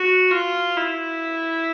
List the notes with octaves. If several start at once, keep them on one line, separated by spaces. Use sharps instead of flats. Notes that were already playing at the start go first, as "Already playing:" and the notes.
Already playing: F#4
F4
E4